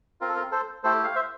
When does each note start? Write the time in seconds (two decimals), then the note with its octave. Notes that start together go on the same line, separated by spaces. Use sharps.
0.21 C4 F4 A#4
0.28 A4
0.36 A#4
0.51 A4 C5
0.83 A3 E4 G4 A4 C5
1.04 F5
1.15 C5 E5